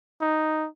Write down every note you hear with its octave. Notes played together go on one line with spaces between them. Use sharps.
D#4